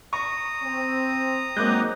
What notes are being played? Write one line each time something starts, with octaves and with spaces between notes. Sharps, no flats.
A#5 C#6 D#6
C4
F#3 G#3 A#3 C4 D#4 D6 F#6 G6